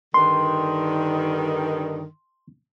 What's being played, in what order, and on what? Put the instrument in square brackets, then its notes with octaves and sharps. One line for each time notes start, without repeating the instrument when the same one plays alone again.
[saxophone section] G2 D3 D#3 [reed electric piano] C6